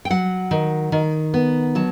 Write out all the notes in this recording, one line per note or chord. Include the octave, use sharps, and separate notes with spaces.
G5
F#3 F#5
D#3
D#3
B3
F#3 A5